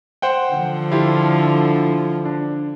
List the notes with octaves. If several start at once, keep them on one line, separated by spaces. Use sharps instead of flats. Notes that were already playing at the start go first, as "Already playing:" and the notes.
C5 F#5 G5
D3 F3
E4 F4 G4
D4